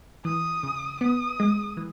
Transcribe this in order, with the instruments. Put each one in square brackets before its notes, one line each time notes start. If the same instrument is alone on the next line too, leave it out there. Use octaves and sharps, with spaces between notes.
[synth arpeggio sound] E3 [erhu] D#6
[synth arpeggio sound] C#3
[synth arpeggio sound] B3 [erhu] D#6
[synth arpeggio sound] G#3
E3